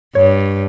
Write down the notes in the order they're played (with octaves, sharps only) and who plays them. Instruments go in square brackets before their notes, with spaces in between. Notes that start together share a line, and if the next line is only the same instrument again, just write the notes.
[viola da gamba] G2 [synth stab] C#5